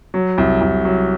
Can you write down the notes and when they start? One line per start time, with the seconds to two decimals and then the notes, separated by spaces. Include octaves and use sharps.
0.14 F#3
0.38 C2
0.61 C2
0.85 F#3